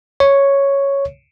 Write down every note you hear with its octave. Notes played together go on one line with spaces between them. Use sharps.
C#5